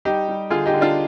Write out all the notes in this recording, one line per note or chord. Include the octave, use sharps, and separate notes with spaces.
G3 D#4 G4
G3
D3 F4 G#4
D#4 G4
D3
D4 F4